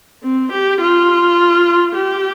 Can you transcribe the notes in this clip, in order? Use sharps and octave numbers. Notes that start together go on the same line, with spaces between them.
C4
G4
F4
G4